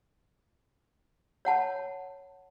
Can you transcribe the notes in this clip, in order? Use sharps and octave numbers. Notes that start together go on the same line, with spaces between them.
C#5 F#5 A5 B5